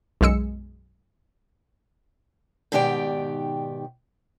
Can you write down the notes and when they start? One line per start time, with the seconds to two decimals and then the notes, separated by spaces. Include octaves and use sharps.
0.21 B1 F#2 G#3 E6 C#7
2.72 G#2 B2 D#3 G4 D5 G5